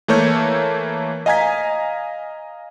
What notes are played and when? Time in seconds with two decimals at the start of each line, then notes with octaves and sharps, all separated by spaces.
0.08 E3 A3 A#3 C#5 G6
1.26 D#5 F5 G#5 A#5 G#6 B6